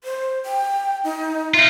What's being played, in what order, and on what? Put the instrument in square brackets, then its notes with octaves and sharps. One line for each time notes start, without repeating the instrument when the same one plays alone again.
[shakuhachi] C5
G5
D#4
[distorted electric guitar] D#4 F4 [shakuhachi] E5